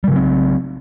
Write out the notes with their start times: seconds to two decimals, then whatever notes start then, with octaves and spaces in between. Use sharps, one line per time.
0.04 G3
0.08 C#3
0.12 F#3
0.16 C4